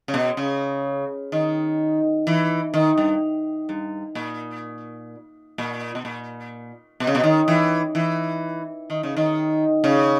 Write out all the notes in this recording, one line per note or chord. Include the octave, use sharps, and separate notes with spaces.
C#3
B2
C#3
D#3
E3
D#3
G2
G2
A#2
A#2
B2
A#2
B2
C#3
B2
D#3
E3
E3
D#3
C#3
D#3
C#3